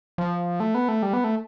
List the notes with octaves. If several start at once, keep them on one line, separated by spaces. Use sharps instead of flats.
F3
A3
B3
A3
G3
B3
A3